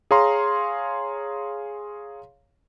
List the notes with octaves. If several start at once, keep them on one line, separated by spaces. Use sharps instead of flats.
G#4 C#5 F5 A#5 C6